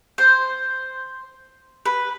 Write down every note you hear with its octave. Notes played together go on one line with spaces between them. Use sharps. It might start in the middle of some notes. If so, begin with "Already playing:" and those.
C5
B4